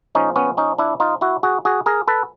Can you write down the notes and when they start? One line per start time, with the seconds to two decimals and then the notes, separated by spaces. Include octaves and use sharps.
0.15 A#2 F3 G#3 C#4 D#4
0.36 B3 C#4
0.57 C#4 D#4
0.78 D4 E4
1.00 D#4 F4
1.21 E4 F#4
1.43 F#4 G#4
1.65 F#4 G#4
1.86 G#4 A#4
2.08 A4 B4